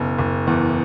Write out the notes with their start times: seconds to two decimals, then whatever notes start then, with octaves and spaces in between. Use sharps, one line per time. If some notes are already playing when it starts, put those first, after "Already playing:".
Already playing: F#1 B2
0.19 F#1
0.47 E2